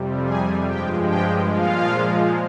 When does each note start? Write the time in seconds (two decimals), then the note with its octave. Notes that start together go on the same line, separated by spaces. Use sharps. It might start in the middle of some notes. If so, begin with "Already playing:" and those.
Already playing: F2 C3 G3
0.25 G#4 G#5
0.66 G2 F3 G#3 G4 G5
1.08 G4 G5
1.50 A#2 F3 G#3 F4 F5